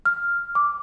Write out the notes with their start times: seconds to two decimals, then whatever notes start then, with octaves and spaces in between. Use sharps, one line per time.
0.05 F6
0.55 D6